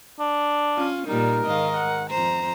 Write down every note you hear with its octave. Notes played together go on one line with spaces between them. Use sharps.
D4
C#4 F4
A#2 G3 D#4 A#4
G#2 D#3 D#5 F5
F#5
F2 C5 A#5